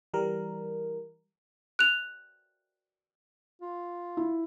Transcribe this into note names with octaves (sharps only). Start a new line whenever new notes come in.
E3 G3 A#4
F#6 F7
F4
E4